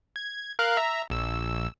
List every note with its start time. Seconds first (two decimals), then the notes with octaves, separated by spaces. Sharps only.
0.16 G#6
0.59 A#4 F5 F#6
0.77 E5 A#5
1.10 A#1 E6